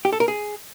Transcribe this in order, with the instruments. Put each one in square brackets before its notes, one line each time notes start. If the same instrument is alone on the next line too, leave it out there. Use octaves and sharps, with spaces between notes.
[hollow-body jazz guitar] G4
A4
A#4
G#4